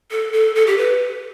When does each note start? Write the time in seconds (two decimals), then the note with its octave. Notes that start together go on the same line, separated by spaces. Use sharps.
0.11 A4
0.33 A4
0.55 A4
0.67 G4
0.77 B4